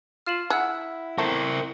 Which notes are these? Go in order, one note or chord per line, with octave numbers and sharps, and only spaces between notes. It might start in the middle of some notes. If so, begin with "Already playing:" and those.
F4 F6 E7 F#7
E4 G#4 F#5 E6 F#6
A3 C4 E4 A#4